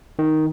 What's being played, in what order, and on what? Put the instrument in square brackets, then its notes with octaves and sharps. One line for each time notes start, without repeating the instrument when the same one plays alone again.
[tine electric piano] D#3